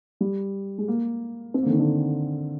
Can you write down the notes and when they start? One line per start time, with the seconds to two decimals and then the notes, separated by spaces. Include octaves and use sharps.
0.21 G3
0.78 G#3
0.88 A#3
1.54 C4
1.63 D3 A#3
1.70 D#3
1.79 D3